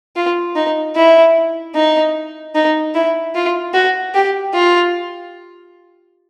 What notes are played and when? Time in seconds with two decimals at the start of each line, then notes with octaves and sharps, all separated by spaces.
0.16 F4
0.56 D#4
0.97 E4
1.76 D#4
2.55 D#4
2.95 E4
3.36 F4
3.74 F#4
4.15 G4
4.54 F4